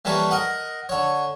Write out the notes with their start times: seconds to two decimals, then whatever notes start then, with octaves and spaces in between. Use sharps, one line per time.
0.05 E3 G3 A#3 A4 B4 C#5
0.31 A#4 D#5 F#5
0.89 D3 C#5